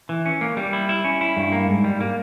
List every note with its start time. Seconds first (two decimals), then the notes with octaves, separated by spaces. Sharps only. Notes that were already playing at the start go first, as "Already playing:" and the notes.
0.09 E3
0.26 C#4
0.41 A#3
0.57 G3
0.73 E4
0.89 E4
1.04 C#4
1.21 E4
1.37 G2
1.52 A#3
1.68 G#2
1.84 G3
2.00 A#3